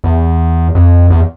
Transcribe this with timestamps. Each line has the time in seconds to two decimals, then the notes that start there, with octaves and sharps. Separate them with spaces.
0.04 E2
0.75 F2
1.10 E2